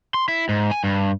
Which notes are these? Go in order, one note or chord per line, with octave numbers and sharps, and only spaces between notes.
C6
E4
G#2
G#5
G2